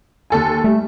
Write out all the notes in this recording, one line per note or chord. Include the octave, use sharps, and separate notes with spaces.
D#2 A4 G#5
G3 A3